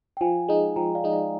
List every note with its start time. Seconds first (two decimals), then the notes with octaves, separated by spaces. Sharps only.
0.17 G5
0.21 F3 F5 G#5
0.49 G#3 D#4
0.76 F3 G5 A#5
0.95 D5 F5
1.04 G#3 D#4
1.13 D5 F5